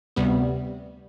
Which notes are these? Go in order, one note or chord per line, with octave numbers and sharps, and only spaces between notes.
D2 C3 G3 B3